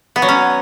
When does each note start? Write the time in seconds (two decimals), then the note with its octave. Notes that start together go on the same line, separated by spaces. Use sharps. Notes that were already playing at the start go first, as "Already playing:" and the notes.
0.16 B3
0.22 F#3
0.29 C#4